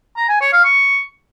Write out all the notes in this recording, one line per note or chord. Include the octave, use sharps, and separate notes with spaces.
A#5
G#5
C#5
F5
C#6